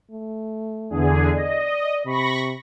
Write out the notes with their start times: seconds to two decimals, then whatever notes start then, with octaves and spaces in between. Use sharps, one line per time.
0.11 A3
0.90 E2 D3 G#4
1.34 D5 D#5
2.05 C3 B5 C#6 A#6